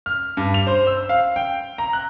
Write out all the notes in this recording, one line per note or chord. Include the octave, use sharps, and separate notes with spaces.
F6
G2
F7
C5
E6
F5
G5
A#5
F#6